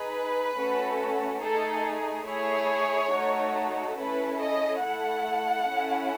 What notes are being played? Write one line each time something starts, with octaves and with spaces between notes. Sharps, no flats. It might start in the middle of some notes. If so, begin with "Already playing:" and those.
Already playing: D#4 G#4 B4
A3 C#4 F#4 A4
A3 D#4 G#4 A4
A3 E4 G#4 C#5
A3 D#4 F#4 A4
C#4 E4 A4 B4
D#5
A3 E4 A4 F#5
C#4 E4 A4